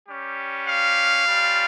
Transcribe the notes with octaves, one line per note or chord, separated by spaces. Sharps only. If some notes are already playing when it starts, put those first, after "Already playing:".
G3 C#4 G4
F5
G3 C#4 F4